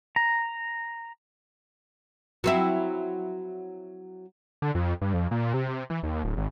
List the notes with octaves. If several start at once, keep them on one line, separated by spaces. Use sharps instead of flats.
A#5
F#3 C4 E4
D3
F2
G2
F2
A#2
C3
C3
E3
D#2
D1
G#1